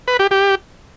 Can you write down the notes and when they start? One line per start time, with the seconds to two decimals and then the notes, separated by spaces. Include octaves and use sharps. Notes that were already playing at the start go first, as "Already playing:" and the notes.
0.08 B4
0.19 G4
0.31 G4